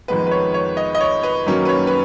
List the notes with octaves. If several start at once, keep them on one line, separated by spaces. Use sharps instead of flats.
F2 D#3 G#3 B3 B4
B4
C#5
C#5
D#5
D#5
C#5
B4
F#2 D#3 F#3 A#3 C#4
B4
C#5
B4